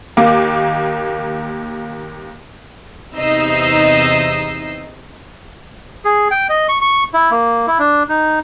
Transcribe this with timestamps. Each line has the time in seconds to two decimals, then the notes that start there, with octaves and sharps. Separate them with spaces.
0.17 D#2 A#3 D6
3.15 E2 C3 D#4 D#5 E6 C7
6.05 G#4
6.31 G5
6.49 D#5
6.69 C#6
6.81 C#6
7.14 E4
7.31 A#3
7.67 E4
7.79 D4
8.09 D#4